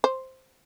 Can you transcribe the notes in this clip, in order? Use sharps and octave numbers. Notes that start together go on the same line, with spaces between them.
C5